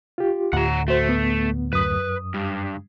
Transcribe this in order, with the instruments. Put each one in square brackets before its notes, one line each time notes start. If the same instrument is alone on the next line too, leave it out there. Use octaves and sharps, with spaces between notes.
[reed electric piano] F4 G4
[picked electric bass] D2 A2 [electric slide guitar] F#5 A#5
[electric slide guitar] A3 [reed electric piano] F#4 C5
[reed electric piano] B3
[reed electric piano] F#2 D#6 [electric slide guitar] B4
[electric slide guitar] G2